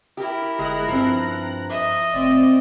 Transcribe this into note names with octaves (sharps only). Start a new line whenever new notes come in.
E4 G4 A#4
G1 G#3 A#5 F#6 A#6
G2 F3 C4
D#5 E5
F1 C4 D5